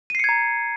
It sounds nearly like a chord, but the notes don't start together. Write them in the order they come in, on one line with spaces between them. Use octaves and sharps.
D#7 C7 C#7 G#6 A#5